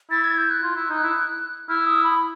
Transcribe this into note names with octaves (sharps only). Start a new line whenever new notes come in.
E4 A6
G#6
G6
F#6
F4
E4
D#4
E4
E4 F6
D#6
B5